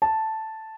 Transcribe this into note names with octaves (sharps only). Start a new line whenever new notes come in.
A5